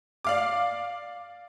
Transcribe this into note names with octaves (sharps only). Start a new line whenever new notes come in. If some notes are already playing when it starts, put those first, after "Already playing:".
D5 F5 D6